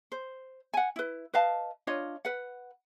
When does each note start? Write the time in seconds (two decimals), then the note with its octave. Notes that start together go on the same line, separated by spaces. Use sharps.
0.12 C5
0.74 F#5 G#5
0.96 E4 B4
1.34 B4 D#5 F5 A5
1.87 D4 F4 C#5 D#5
2.25 B4 F#5